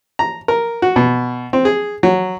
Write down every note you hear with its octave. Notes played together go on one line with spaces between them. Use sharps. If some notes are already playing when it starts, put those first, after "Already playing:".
A#5
A#4
F#4
B2
C4
G#4
F#3